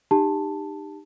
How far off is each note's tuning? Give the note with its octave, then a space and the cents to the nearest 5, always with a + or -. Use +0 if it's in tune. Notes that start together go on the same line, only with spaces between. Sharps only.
D#4 -25 G4 +15 A5 +0